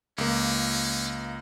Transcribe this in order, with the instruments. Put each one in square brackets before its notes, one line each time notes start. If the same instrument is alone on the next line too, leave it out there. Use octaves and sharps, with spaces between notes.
[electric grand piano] C#2 A#3 [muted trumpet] C#4